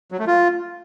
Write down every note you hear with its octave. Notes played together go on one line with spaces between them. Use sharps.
F#3
A3
F4